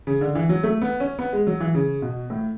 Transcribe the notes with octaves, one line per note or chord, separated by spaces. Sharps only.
C#3
D3
E3
F#3
A3
B3
C#4
B3
G#3
F#3
E3
C#3
B2
A2